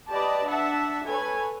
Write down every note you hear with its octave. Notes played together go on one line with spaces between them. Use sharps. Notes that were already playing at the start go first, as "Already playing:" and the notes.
G4 B4 D5 D#5 A5
D4 E5 F#5 A5
A4 B4 C#5 G#5